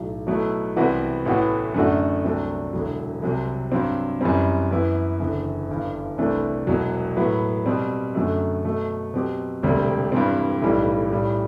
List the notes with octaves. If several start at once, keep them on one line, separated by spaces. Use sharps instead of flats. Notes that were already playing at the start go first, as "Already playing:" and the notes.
Already playing: B1 A2 F#3
B2 F#3 A3 E4
C2 C3 E3 B3 F#4
A1 A2 E3 B3 F#4
F#2 D3 A3 D4 F#4
C2 C3 F#3 A3 D4
E1 E2 D3 F#3
C2 C3 F#3
G2 F#3 C4
F#2 E3 G3 C4
F#2 E3 B3 E4
F#1 E2 D3
G1 G2 E3
C2 C3 E3 A3 D4
E1 E2 B2 F#3
A2 F#3 B3
B2 G3 C4
F#2 D3 F#3 A3
B2 F#3 A3
B2 F#3 C4 G4
E1 D2 C3 G3
G2 E3 G3 C4
B1 A2 E3 G3
A1 A2 G3